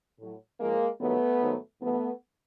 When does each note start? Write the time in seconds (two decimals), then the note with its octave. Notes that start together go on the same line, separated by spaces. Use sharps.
0.20 A2 F#3
0.60 G#2 F3 G#3 A#3
1.01 G2 D#3 F#3 A3 B3
1.42 G#2 D#3 F#3
1.82 G2 E3 A3 B3